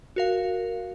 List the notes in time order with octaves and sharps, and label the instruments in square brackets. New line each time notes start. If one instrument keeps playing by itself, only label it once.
[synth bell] F#4 A#4 F5